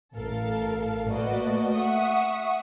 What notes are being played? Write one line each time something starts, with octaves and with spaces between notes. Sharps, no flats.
A1 A4 A#4 F5
A3 A#3 F#4 B4 D5 D#5
E5 F#5 C#6 D#6